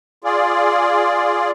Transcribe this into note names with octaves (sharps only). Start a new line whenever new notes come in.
F4 G#4 D5